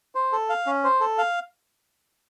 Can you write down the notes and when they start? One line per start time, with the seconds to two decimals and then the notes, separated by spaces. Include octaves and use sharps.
0.15 C5
0.32 A4
0.49 F5
0.66 C#4
0.84 C5
1.01 A4
1.18 F5